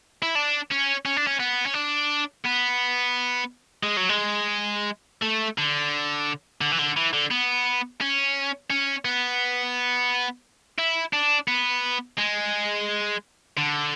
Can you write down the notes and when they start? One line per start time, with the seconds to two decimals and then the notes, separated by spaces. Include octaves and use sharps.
0.23 E4
0.35 D4
0.71 C#4
1.05 C#4
1.17 D4
1.27 C#4
1.40 B3
1.67 C#4
1.74 D4
2.45 B3
3.83 G#3
3.97 F#3
4.09 G#3
5.23 A3
5.58 D3
6.61 D3
6.72 E3
6.79 D3
6.97 E3
7.13 D3
7.31 B3
8.01 C#4
8.70 C#4
9.05 B3
10.78 E4
11.13 D4
11.48 B3
12.18 G#3
13.58 D3